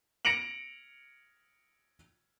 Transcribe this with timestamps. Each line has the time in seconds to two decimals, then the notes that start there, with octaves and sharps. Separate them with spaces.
0.25 A#6 C#7 D7 F7 F#7